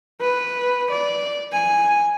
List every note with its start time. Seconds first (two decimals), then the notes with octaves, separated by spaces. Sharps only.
0.21 B4
0.90 D5
1.53 G#5